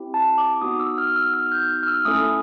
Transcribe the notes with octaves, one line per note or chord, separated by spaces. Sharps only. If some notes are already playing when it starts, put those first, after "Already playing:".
Already playing: C4 E4 G4
A5
D6
B3 D#4 F#4 D#6
E6
F6
F6
E6
F6
G6
F6
E6
A3 C#4 E4 A4 D#6